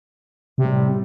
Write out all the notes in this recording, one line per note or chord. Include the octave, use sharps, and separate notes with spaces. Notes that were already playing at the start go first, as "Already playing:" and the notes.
A2 C3 G3